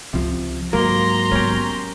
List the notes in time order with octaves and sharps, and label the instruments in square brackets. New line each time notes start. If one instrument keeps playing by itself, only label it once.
[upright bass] C#2 [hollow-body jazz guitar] C3 F3
[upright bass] D#2 [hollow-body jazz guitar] G#2 F#3 [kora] A#3 [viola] A#5 C6
[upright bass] B3 D#4 [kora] C#4 G4